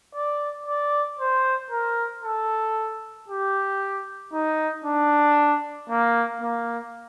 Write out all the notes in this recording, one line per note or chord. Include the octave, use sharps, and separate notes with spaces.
D5
D5
C5
A#4
A4
G4
D#4
D4
A#3
A#3